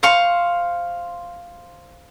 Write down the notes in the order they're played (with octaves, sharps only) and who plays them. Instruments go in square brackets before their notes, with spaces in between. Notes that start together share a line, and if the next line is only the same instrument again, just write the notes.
[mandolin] C5 F5 C#6